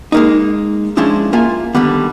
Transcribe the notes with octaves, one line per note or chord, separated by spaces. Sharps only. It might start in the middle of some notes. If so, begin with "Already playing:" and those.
G#3 A#3 D#4
F3 G#3 C#4 D4 E4
A#3 F4 E5 G#5
D3 D#3 G3 B3